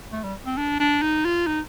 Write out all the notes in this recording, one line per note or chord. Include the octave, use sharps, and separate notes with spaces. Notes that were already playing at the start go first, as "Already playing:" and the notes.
A3
G3
C4
D4
D4
D#4
F4
D#4